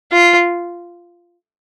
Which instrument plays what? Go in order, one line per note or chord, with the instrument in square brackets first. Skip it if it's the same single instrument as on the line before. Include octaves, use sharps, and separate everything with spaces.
[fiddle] F4